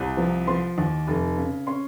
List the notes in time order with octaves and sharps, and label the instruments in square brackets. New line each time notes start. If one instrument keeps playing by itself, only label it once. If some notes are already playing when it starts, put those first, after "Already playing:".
Already playing: [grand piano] C2 C3
F3
F3 C6
D#2
F1
C#3
C#4 C6